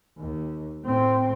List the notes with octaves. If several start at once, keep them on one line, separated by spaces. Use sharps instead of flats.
D#2
A2 C4